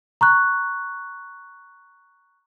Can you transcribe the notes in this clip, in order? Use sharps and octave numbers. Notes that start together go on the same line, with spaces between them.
A#5 C#6 F#6